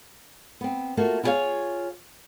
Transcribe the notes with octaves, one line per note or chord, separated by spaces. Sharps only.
B3 C4
A3 A#3 F4 F#4
E4 F4 G#4 A4 C#5 F5